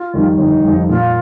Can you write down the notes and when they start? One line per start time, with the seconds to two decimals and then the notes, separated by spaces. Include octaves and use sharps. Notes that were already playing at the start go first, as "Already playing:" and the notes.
Already playing: F4
0.14 F2 D#3 G3
0.38 G1 D#4
0.64 F2 D#3 G3
0.89 A#2 F4